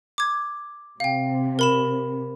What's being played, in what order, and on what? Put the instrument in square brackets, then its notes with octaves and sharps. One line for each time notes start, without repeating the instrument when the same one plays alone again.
[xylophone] D6 G#6
[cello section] C3 [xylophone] F5 G5
[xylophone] A#4 B5 E7